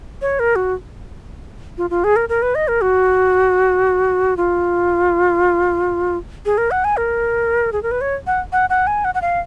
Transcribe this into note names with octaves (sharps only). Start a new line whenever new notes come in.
C#5
A#4
F#4
F4
F4
G#4
A#4
A#4
B4
D#5
A#4
F#4
F4
G#4
A#4
F#5
G#5
A#4
G#4
A#4
B4
C#5
F#5
F#5
F#5
G#5
F#5
F#5
F5